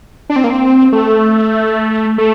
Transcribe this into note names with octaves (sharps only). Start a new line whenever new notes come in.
D4
C4
A#3
C4
A3
A3